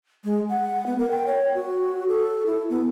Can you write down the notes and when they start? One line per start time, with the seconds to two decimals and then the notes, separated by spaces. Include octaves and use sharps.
0.24 G#3
0.50 F#5
0.86 B3
0.99 A#4
1.11 G5
1.27 C#5
1.55 F#4
2.08 A4
2.46 E4
2.70 B3